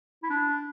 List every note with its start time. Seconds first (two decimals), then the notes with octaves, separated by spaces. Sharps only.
0.23 E4
0.30 D4